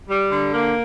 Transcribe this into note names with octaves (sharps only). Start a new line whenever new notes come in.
G3
D3
A#3